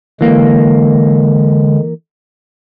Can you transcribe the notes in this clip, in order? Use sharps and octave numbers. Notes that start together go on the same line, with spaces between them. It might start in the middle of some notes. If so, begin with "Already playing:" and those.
D3 E3 G#3 A#3